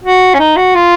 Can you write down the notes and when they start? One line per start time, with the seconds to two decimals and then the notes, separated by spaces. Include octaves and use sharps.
0.03 F#4
0.34 C#4
0.39 D#4
0.57 F#4
0.75 F4